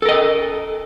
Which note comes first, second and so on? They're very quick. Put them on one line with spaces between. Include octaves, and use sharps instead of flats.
A4 A#4 D#5